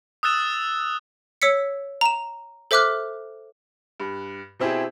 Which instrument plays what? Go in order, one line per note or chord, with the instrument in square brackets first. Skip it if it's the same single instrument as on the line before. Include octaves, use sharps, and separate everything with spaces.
[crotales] D#6 E6 F#6 A6 E7
[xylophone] C#5 E6 B6 C#7
A#5 E7
A4 C5 E5 D6 F6 F#6
[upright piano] G2
B2 C4 E4 G4 G#4